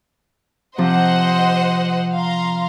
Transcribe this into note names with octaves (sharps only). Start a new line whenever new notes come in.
C3 F3 C4 C5 D#5 F#5
F5 A#5 C6